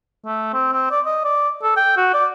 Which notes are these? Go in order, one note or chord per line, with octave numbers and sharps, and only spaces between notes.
A3
C4
C4
D5
D#5
D5
A4
G5
F#4
D5